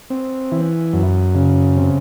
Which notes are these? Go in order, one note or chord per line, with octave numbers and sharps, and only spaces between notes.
C4
E3
F#2
C#3
C3